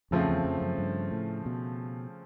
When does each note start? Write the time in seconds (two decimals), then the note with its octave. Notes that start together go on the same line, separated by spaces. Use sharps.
0.11 F2 C#3 F3 A3 C4
0.29 E2
0.44 F2
0.61 F#2
0.78 G2
1.12 A2
1.46 B2